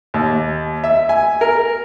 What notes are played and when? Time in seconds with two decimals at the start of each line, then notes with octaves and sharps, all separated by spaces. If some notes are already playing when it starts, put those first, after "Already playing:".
0.14 D#2
0.84 E5
1.09 G#5
1.41 A#4